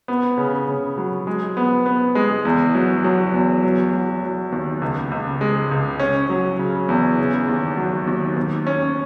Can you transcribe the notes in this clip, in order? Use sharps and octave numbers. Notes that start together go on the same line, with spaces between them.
B3
C#3
C#3
F#3
G#3
B3
B3
G#3
E2
F#3
F#3
E2
F#3
F#3
F#3
D#2
C#2
C#2
G#3
C#2
C#4
F#3
C#3
E2
C#3
D#2
F#3
D#2
D#2
C#4